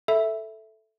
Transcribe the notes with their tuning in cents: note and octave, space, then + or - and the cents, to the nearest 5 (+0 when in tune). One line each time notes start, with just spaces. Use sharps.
A4 +0 E5 -5 B5 +0